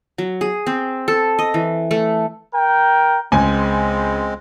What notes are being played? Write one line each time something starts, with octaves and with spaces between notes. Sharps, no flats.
F#3
G#4
C4
A4
D#5
E3
A3
A#4 G5
C#2 G#3 C4 G#5